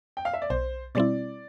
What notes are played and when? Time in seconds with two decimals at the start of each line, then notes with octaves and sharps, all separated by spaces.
0.17 G5
0.25 F5
0.33 E5
0.42 D5
0.50 B1 C5
0.95 B2 G3 C4 E4 D5